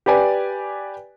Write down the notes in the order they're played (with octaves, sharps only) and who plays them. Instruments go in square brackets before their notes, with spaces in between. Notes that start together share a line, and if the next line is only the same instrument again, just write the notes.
[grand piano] G4 B4 D5 G#5